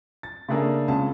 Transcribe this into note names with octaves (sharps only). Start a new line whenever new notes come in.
A6
C#3 A3 A#3 D4 G#4 A#4
C#2 C#4 A5